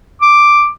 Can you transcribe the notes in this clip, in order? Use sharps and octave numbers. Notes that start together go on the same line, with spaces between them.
D6